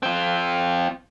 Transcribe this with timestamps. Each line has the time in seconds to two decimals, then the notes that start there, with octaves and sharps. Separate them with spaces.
0.03 C4 F4